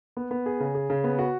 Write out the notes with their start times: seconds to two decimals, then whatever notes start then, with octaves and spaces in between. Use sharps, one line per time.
0.17 B3
0.31 B3
0.46 G#4
0.60 C#3
0.75 G#4
0.90 C#3
1.04 B3
1.19 F#4